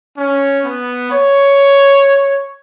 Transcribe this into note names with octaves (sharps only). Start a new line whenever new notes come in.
C#4
B3
C#5